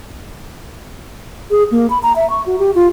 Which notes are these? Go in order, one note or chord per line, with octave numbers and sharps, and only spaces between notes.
G#4
A#3
B5
A#5
E5
C#6
F#4
G4
F4